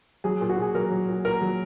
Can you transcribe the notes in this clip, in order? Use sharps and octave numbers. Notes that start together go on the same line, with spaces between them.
F#3 G#4
A#2
F#4
A#2 G#4
F#3 A#4
F#3
A#2
A#2 A#4
F#3